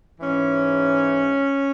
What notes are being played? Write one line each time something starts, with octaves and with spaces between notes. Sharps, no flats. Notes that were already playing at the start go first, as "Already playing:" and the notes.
G#2 E3 C#4